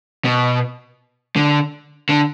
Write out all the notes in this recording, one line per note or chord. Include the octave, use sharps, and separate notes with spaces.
B2
D3
D3